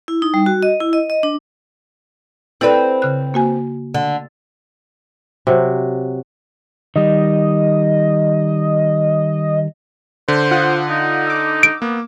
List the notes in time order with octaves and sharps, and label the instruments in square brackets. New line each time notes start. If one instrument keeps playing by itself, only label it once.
[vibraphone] E4
D#4
G3
F#4
D#5
E4
D#5
D#5
D4
[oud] C4 B4 [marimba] E4 A4 D5
[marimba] C#3 F#6
A#3 F#4 G#5
[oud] D3
[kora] C3 F#3
[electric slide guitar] D#3 G3 [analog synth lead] D#5
[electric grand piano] D3 [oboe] C5
[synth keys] F4 F#5 D#6
[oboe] D#4
[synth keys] D6 E6
[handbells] D7
[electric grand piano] A#3 [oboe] B3